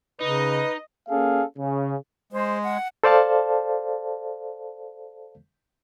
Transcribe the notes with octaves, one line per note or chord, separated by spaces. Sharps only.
C#3 D#4 B4 D#5
A#3 C#4 G#4 A4 F5
C#3
G#3 C5
F#5
A4 C5 D5 F5 A5